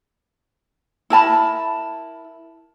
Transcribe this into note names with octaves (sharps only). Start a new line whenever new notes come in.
E4 A#4 A5 B5